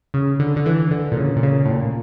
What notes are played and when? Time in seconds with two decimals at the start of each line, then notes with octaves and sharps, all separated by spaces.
0.14 C#3
0.39 D3
0.56 D3
0.66 E3
0.91 D3
1.12 A#2
1.17 C#3
1.36 A#2
1.43 C#3
1.65 A2
1.70 A#2